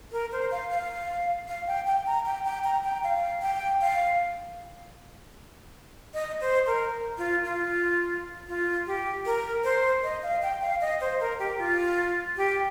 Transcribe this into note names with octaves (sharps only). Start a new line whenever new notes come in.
A#4
C5
F5
F5
F5
G5
G5
A#5
G5
G5
A#5
G5
F5
G5
F5
D#5
C5
A#4
F4
F4
F4
G4
A#4
C5
D#5
F5
G5
F5
D#5
C5
A#4
G4
F4
G4